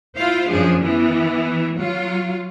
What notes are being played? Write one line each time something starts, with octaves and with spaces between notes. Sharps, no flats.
E4 F4 C5 F5
F#2 F3 D4 G#4
E3 B3 E4
F#3 F4